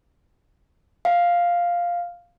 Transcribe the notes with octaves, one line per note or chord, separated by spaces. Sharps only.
F5